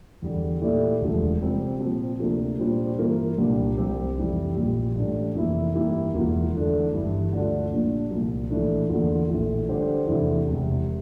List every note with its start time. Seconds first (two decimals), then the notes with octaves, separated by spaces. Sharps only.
0.22 E2 D3 G3
0.61 A#2 A3 E4 G4 D5
1.01 E1 D2 D3 F3 A3
1.41 C3 G3 C4
1.80 A#2 F3 C4
2.19 D2 C3 F3 A#3 D4
2.59 A#2 G3 D4 F4 C5
2.98 G2 E3 A#3 F4 A#4
3.38 C2 A#2 G3 D4 G4
3.77 C2 C3 G3 C4 G4
4.17 F1 F2 E3 G3
4.56 A#1 A#2 G3
4.95 A1 A2 G3 D4
5.35 F1 F2 E3 A#3 E4
5.74 G2 E3 A#3 E4 G4
6.14 E1 E2 E3 A#3 F4
6.53 E2 D3 A3 D4
6.93 G1 G2 E3
7.31 D2 D3 A3 D4 F4
7.71 A#1 A#2 G3 D4
8.11 C2 A#2 F3
8.50 A#1 A2 E3 A3 D4
8.89 E2 D3 F3 A#3 F4
9.29 A#1 A2 E3 A3
9.68 D3 G3 D4 G4 C5
10.08 E2 C3 E3 A3 D4
10.48 E1 E2 C3